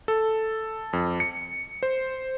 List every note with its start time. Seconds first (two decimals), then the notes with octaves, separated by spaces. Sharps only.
0.08 A4
0.93 F2
1.20 C#7
1.83 C5